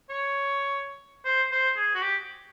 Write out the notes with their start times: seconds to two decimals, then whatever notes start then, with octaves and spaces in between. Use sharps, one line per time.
0.10 C#5
1.25 C5
1.52 C5
1.77 G#4
1.95 F#4
2.02 G4